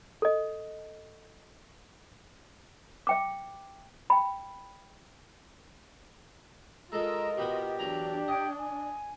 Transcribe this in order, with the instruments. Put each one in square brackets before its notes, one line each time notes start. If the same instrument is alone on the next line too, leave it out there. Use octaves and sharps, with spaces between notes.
[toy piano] A4 D#5
E5 G5 D6
G5 B5
[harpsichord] G#3 A4 [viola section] F4 A#4 [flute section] D#5 [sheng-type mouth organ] A#5 E6
[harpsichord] B2 B3 F#4 [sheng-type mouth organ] G4
[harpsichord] E2 F#3 A#5 [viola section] D4
[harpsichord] D#5 [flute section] G5 G#6
[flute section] G#5